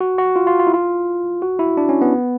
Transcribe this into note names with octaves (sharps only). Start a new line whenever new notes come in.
F#4
F#4
F4
F4
F4
E4
F4
F#4
E4
D4
C#4
B3